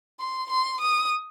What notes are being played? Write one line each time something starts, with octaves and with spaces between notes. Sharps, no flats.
C6
C6
D#6